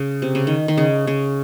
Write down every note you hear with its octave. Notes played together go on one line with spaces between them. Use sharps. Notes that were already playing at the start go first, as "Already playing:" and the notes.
Already playing: C#3
C3
C#3
D#3
D#3
C#3
C#3